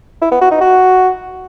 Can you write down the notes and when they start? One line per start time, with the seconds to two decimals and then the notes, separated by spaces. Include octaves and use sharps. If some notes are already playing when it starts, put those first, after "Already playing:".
0.22 E4
0.31 B3
0.41 F#4
0.51 D#4
0.61 F#4